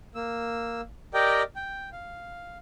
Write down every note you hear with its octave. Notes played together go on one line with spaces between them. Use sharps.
A#3 E6
G4 A#4 D5 D#5 G5
G5
F5